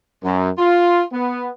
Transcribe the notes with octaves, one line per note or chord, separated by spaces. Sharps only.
F#2
F4
B3